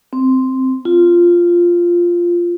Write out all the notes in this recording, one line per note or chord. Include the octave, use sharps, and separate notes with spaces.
C4
F4